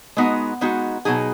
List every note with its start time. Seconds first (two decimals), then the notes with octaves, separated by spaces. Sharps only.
0.17 G#3 B3 D#4 F#4
0.61 G#3 B3 D#4 F#4
1.05 B2 F#3 D#4 G#4